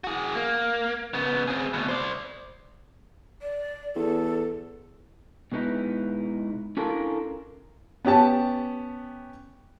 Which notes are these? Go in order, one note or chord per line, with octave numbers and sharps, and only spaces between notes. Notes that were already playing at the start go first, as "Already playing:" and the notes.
F#4 G#4
A#3
C#3 B3
C4 G#4
D2 B2
C5 D5
D5
E2 A4
B2 G#3 B3 D#4 E4
C#4 D4 E4 F4 A4 A#4
B3 C#4 G4 A5